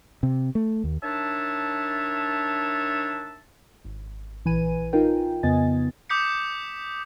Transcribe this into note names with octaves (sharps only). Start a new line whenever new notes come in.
C3
A3
D#2
D#3 D4 C#5 E5 A5
G#1
A#1 E3 B4 G#5 D#7
D#4 F4 A#4 G5
F2 C#3 B3 D#5 G#5 A6
D6 D#6 G6 B6 C#7